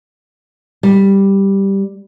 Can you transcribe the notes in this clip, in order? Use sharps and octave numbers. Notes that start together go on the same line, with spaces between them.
G3